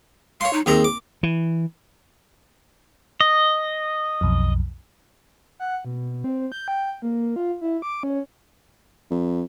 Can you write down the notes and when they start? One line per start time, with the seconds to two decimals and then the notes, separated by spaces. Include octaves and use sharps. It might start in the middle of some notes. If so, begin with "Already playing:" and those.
0.41 C#5 F5 C6
0.53 D#4
0.66 D#2 C4 G#4 A#5
0.84 D6
1.23 E3
3.21 D#5
4.21 B1 F2
5.59 F#5
5.85 B2
6.24 C4
6.52 G6
6.68 G5
7.02 A#3
7.36 F4
7.61 E4
7.82 D6
8.03 C#4
9.11 F2